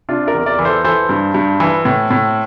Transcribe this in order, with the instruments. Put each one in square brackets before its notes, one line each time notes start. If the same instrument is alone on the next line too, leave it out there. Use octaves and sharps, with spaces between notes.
[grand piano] C3 D4 F4
A#4 D5
E2
A#4 D5
E3
A4 C5
E3 A4 C5
G2
G2
E3
A2
A2